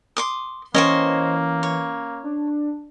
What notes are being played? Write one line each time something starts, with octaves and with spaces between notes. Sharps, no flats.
C6 D6 D#6
E3 A#3 C#4 C5 C#5 D#5 G5
C#5
D4